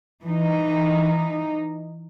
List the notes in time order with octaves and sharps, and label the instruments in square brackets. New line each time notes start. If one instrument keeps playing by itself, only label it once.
[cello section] E3 D#4